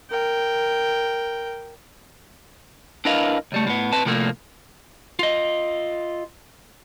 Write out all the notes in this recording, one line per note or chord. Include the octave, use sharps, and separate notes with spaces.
A#4 G5
D4 E4 A#4 B4 D#5 F5
C#2 G3 A3
A2 B3
C4 B4 A5
A2 C3 F3 A3 A#3
F4 D#5